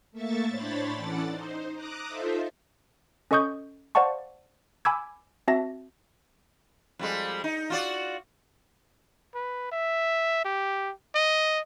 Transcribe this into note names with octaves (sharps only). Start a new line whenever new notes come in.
A3 A#3 E5 C#6 A6
A2 D4 C5 C#5 B5 A6
E3 C#4 A4 D5 F#5 A6
D#4 C5
A#5 D6 D#6 F#6
D#4 F4 A4 C5 E5
C#4 A4 D#5 C#6 D#6 G6
C5 D5 F5 F#5 A5 C#6
G#5 B5 D6 E6 G#6
C4 F#4 E5 A5 A#6
F2 G3 G#3
D#4
F4 F#4 D5
B4
E5
G4
D#5